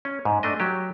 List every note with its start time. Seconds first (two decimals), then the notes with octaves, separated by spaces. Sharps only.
0.05 C#4
0.25 G#2
0.43 A3 D4 D#5
0.60 F#3 G4